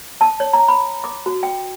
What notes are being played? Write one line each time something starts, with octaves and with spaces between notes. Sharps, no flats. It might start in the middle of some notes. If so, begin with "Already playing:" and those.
A5
C#5
A#5
B5
D6
F#4
G5